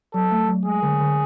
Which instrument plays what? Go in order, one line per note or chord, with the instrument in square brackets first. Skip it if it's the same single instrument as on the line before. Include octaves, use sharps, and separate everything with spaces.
[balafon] F#3 [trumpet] A4
[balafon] A3
F#3
[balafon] G#3 [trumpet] G#4
[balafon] D3
D3